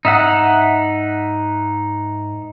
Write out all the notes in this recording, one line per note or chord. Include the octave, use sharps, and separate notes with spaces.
G#2 D#4 E5 F#5